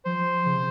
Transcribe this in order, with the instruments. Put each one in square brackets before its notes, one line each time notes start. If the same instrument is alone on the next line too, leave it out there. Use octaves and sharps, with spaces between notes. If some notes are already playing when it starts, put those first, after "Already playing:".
[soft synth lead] F3 [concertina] C5
[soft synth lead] C#3
C3